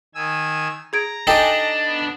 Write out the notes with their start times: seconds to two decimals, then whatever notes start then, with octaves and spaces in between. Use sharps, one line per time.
0.15 D#3 G#5 E6
0.93 G#4 A#5 G#6 D7
1.27 D4 D#4 G4 A4 G5 G#5
1.84 B3